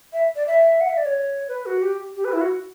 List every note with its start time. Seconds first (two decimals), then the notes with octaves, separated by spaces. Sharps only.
0.13 E5
0.36 D5
0.47 E5
0.81 F#5
0.89 E5
0.97 D5
1.06 C#5
1.48 B4
1.66 F#4
1.82 G4
2.16 G4
2.25 B4
2.32 E4
2.41 F#4